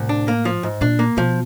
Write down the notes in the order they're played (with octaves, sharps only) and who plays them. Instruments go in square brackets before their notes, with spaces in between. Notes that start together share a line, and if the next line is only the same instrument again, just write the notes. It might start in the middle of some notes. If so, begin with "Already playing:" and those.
Already playing: [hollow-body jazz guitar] C2 [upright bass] A2
[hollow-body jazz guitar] D4
A#3
F3
G#2
[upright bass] A#2 [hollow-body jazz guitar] D4
[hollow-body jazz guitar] A#3
[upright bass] B2 [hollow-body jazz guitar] F3